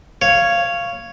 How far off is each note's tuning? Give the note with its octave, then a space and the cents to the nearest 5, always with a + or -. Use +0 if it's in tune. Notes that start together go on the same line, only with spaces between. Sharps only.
C#5 +0 F5 -15